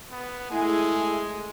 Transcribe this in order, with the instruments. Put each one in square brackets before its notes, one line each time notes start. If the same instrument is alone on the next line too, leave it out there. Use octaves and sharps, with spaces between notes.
[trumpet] B3
[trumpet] G#3 [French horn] A3 [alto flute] E4 [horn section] G#4 G#5